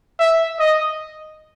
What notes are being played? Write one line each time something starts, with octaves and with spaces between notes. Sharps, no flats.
E5
D#5